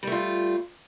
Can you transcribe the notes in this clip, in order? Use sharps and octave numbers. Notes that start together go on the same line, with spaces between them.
G3 A3 F4